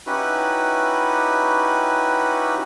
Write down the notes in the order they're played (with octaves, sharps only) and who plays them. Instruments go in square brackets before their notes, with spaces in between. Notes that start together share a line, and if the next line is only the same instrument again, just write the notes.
[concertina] C#4 D#4 E4 F#4 G4 B4